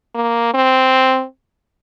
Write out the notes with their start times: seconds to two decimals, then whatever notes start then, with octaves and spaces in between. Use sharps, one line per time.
0.15 A#3
0.54 C4